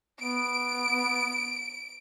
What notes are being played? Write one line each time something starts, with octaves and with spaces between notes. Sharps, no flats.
B3 D7